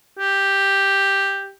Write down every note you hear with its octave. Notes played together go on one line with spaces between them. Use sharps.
G4